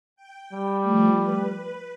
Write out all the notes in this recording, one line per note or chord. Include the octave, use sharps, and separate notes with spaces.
G5
G3
F3 A3
B4